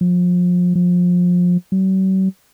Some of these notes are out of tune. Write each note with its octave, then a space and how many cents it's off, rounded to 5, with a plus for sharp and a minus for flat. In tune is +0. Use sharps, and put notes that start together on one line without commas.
F3 +30
F3 +25
F#3 +45